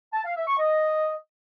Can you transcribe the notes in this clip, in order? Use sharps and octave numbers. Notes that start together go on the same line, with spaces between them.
A5
F5
E5
C#6
D#5